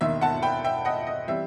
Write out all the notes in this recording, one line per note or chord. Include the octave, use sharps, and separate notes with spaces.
E1 D#2 D#3 E5
F#5 A5
G5 B5
E5 G5
D#5 F#5
D#5
E3 G3 C4 E5